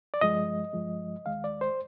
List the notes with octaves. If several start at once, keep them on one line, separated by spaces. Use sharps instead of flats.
D5
G2 F3 G#3 D#5
G2 F3 G#3
D#2 D#3 G#3 F5
D5
C5